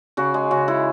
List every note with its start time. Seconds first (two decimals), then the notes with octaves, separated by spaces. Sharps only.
0.17 C#3 F#4
0.34 G#3
0.51 C#3 F#4
0.68 G#3 E4